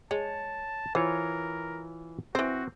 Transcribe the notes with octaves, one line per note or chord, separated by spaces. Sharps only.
G#3 C#5 A5
E3 F4 A#4 C5 C#5
E3 C4 F#4 C5